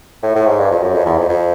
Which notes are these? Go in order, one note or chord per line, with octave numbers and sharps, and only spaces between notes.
A2
A2
G#2
G2
F2
F#2
F2
E2
F2
F2